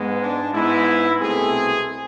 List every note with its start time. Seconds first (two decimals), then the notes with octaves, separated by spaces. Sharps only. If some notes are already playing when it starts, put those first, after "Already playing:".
Already playing: G#2 G#3 B3
0.21 D4
0.53 G#2 G#3 B3 E4
1.20 C2 B2 A3 C4 G#4